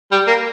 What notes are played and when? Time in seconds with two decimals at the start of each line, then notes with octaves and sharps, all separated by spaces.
0.11 G3
0.27 A#3